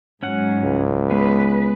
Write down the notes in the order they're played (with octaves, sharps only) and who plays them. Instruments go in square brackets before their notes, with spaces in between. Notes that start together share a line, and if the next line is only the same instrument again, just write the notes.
[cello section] G#2 F#3 [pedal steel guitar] C#4 F#5
[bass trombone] C#2
[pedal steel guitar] G#3 B3 [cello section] B4